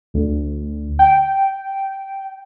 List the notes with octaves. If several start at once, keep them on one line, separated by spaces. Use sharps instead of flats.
D2
G5